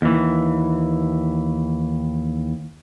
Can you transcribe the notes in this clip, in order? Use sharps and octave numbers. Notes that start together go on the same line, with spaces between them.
D#2 E3